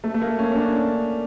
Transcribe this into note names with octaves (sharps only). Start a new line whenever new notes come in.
A3
A3
A#3
C#4
C#4
D4